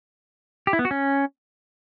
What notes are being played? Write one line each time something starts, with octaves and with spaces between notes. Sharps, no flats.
G4
E4
B3
F#4
C#4